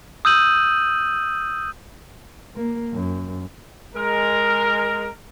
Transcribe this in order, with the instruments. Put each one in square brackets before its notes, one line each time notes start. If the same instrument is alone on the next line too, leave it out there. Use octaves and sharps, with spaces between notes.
[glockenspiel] D#6 E6 G6 D#7 F#7
[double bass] A#3
F#2
[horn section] G#3 A#4